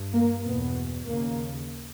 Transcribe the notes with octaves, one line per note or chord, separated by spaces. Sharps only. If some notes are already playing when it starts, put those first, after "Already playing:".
Already playing: G2
A#3
E2 B2 B3
D#2 C#3 A#3